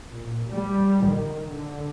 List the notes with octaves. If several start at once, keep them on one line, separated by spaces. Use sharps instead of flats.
A#2
G3
D#3
D3